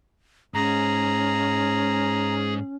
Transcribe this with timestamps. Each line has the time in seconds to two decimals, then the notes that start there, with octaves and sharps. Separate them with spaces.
0.54 G#2 C#4 G#4 A#5